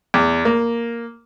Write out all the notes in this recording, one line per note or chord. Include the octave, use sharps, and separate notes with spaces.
E2
A#3